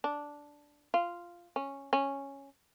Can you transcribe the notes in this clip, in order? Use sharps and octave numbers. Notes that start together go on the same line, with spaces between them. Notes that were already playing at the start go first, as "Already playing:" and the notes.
D4
F4
C#4
C#4